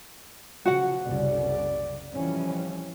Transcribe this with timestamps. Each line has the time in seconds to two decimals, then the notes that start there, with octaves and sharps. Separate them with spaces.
0.66 C#3 F3 F#3 F#4 F#5
1.05 F#1 C2 C#3 D5
2.13 F2 E3 F3 G3 C#4